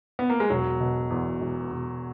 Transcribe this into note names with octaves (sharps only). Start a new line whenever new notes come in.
B3
A#3
G#3
E1 F#3
B2
E2
E1
E1